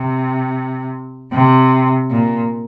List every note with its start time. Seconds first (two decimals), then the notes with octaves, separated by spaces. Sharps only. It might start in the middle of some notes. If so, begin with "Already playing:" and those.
Already playing: C3
1.33 C3
2.11 A#2